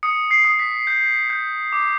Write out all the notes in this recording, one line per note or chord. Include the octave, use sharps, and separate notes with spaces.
D#6 C#7
C7
D#6
B6
G6
G6
D6